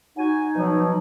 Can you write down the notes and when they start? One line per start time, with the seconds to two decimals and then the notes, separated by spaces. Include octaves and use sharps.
0.17 D#4 F#4 G#5
0.56 B2 F3 F#3